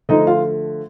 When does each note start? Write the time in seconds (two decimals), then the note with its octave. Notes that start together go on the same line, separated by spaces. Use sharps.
0.09 D3 F3 A3 D#4 D#5
0.27 F4 F5